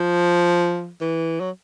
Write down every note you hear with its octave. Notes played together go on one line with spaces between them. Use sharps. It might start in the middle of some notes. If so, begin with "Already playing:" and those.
Already playing: F3
E3
F#3